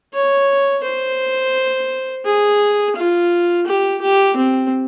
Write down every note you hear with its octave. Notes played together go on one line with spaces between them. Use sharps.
C#5
C5
G#4
F4
G4
G4
C4